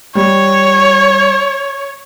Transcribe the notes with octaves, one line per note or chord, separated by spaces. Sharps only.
G3 C#5